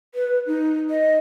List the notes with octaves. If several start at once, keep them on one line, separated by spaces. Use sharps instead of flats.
B4
D#4
D#5